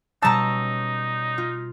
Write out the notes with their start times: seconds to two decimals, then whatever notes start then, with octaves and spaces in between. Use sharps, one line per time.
0.23 B2 G3 C#4 D#4 A5 A#5 E6
1.38 F4